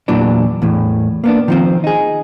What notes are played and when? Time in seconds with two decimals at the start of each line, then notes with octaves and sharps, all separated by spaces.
0.08 E2 A#2 E3 F#3 D4
0.62 E2 A2
1.24 A#3 B3 D4
1.48 D#3 F3 C4
1.84 D#4 G#4